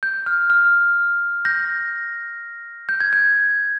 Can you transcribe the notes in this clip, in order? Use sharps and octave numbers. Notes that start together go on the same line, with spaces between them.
G6
F6
F6
G6 A#6
G6
G#6
G6